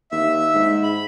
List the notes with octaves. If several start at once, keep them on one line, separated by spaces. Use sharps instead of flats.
D#2 E5
G#2
B5